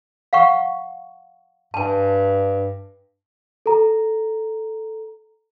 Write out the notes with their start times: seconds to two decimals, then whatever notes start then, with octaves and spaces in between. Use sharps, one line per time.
0.33 F5 F#5 C#6
1.74 G2 G#5 A5
3.66 A4 A#5